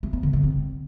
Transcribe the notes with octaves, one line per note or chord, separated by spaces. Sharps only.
A3
B3
D3
D3
C4